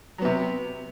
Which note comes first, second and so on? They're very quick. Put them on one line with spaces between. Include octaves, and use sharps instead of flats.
F#3 B3 C3